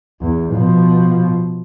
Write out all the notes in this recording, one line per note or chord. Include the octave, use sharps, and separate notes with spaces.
E2
B2 F3